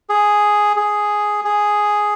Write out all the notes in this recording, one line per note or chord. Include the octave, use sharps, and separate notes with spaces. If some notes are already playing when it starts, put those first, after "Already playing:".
G#4
G#4
G#4